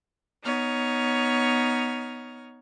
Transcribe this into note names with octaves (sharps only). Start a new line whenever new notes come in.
B3 D#4 C#5 F6